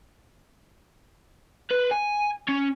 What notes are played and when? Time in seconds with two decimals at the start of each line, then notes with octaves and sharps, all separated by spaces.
1.71 B4
1.91 G#5
2.48 C#4